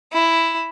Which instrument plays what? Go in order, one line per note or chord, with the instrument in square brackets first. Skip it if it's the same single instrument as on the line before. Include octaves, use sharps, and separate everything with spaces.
[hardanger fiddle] E4